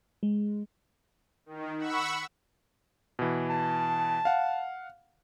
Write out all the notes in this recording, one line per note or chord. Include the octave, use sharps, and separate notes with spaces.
G#3
D#3
F#5 B5 C#6 E6
B2 E3
A5
F5 F#5